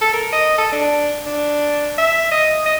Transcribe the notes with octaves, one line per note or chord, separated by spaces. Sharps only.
A4
A#4
D#5
A4
D4
D4
E5
D#5
D#5